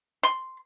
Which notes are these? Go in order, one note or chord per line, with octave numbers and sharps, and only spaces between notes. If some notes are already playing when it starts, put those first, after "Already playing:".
C6